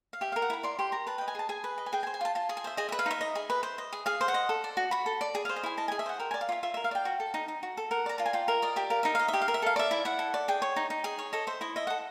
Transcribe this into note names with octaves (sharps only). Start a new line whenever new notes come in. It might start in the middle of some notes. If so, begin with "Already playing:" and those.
F5
G4 E5
A#4 F5
F#5
E4 B5
D5 C6
G4 C6
A#4 A#5
B4 A5
D#5 G5
G#5
G#4 A5
G#4 G#5
B4
D#5
G#5
G#4 G5
G#5
C5
G#5
F4 A5
F4 A5
G#4
G#5
C5 E5
G#4 D#5
B4 E5
F5
D#4 E5
D#5
G#4
B4
C5
D#5
G#4
G#4 F5
C5
F#5
D#5
A4
D5
F#4
F#4 B5
A4
D5
G#4
C5 F5
D#5
E4 G#5
D#5 A5
G#4 G#5
E5
C5 F#5
A#4 G5
D5 G#5
F5
F4 E5
F4 E5
A#4 E5
F5
D5 G5
F#4
A4
D#4
D#4
F#4
A4
A#4 F#5
D5 A#5
F4 A5
G#5
F4 G5
A#4 E5
D5 D#5
G4 E5
A#4 F5
D#4 E5
D#5 F5
E5
G4
F5
A#4
E5
A4 F5
D5 E5
E4
E4 F#5
A4
D5
G#4 G5
C#5
D#4
D#4
G#4
C#5
A4 D#5
C5 E5
E4 D#5
D#5 E5
A4 F#5